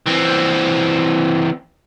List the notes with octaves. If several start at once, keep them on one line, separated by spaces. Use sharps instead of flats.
E3 C4